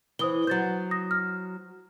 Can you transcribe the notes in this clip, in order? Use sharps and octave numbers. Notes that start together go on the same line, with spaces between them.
E3 C5 D#6 G7
F#3 C5 G6 A6
D#6 A#6
F6